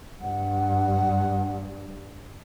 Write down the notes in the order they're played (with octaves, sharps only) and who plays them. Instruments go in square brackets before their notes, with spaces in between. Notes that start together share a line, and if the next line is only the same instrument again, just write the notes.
[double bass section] G2 [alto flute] F#5